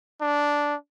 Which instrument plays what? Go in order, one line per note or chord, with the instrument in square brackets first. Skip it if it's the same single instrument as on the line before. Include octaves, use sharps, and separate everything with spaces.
[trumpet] D4